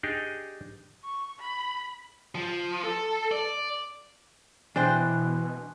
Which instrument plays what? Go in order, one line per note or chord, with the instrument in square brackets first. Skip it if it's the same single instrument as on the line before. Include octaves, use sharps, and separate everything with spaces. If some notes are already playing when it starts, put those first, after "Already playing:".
[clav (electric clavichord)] D4 D#4 G4 G#4 D5 D#5
[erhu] C#6
B5
[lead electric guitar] F3
A4
D5
[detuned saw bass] B2 [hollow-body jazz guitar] E3 C5 G5 [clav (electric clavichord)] D4 [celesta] G#5 C6 F#6